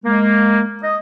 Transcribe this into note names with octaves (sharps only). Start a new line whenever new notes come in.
G#3 A#3
D#5